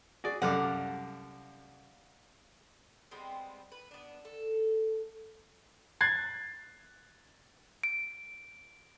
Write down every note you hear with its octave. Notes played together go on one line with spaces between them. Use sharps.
F#4 G#4 D5
C2 F#2 A3 D5 F5 F#5
G3 G#3 B3 C4
B4
B3 D4
A4
F#6 G#6 A6 C7
D7